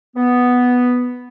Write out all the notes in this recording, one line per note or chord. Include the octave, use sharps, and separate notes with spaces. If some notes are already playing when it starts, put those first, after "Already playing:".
B3